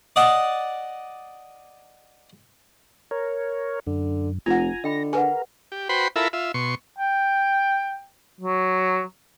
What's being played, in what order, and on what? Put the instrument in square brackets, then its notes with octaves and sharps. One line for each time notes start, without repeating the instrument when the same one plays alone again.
[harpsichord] D5 D#5 F#5 A5
[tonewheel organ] A#4 C#5
[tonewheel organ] F#2 [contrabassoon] D3
[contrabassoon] F1 [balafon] F4 F#5 [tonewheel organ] G#5 A#5
[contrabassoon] D3 [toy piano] D#5 G5 B5 [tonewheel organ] A#6
[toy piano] G#4 B4 F#5 [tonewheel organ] A#4 [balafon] G#5
[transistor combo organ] G4
F#4 B4 C5 G5 B5 C6
E4 F4 A4 A#4 E5 B5
F4 E5
B2 C6 C#6
[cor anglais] G5
F#3